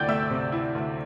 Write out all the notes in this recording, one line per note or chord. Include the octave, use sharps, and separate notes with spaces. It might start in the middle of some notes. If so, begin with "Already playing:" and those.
Already playing: D2 C3 E4 D5 G5 G6
A3 E5 E6
C3
E4
D2